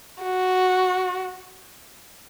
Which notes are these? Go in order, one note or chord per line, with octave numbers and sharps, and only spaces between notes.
F#4